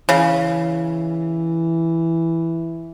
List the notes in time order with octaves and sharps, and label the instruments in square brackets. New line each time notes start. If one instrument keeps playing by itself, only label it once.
[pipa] C#3 [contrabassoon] E3